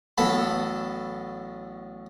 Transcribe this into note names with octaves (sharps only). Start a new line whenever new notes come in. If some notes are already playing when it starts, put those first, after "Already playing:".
A1 F#3 B3 A4 A5 B5